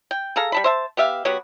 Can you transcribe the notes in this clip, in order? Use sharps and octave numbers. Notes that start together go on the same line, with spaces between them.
G5
G#4 A4 F5 A#5
G3 A5 B5
C5 E5 A5
B3 G4 E5 F5
F#3 B3 F#4 G4